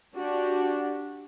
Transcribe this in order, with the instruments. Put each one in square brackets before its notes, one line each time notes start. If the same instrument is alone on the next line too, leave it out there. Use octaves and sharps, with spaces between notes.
[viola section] D4 F#4 G4